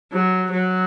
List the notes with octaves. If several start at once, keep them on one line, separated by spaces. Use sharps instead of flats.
F#3
F#3